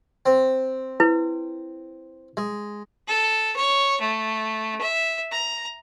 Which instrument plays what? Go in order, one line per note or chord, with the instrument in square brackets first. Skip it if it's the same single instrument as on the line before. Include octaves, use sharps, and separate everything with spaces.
[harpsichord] C4
[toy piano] E4 B4
[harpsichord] G#3
[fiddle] A4
C#5
A3
E5
A#5